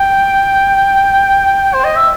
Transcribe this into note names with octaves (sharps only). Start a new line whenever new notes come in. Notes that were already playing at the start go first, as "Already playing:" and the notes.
Already playing: G5
C5
D#5
E5